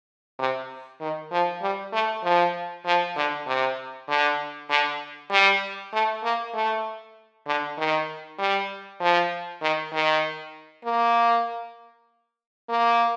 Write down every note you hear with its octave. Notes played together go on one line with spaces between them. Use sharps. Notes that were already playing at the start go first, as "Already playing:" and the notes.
C3
D#3
F3
G3
A3
F3
F3
D3
C3
D3
D3
G3
A3
A#3
A3
D3
D#3
G3
F3
D#3
D#3
A#3
A#3